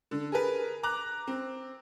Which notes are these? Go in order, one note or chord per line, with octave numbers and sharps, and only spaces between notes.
D3
G#4 A#4 B4
A#5 D6 F#6
C4